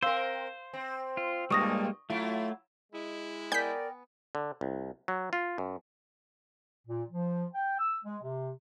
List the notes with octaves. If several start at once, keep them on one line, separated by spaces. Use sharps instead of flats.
C4 A#4 C5 F5 C6 E6
C4
F4
G2 A#2 G3 G#3 A#3 C#6 D#6 A#6
F#3 A3 E4 F4
G#3 E4
B3 A#4 D5 G5 G#5 G6 B6
D3
C2
F#3
F4
F#2
A#2
F3
G5
E6
G#3
C3